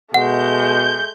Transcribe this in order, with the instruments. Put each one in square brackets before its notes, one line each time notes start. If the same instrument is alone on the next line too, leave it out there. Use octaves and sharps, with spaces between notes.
[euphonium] B2 [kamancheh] G#3 A3 [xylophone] F#5 [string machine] G6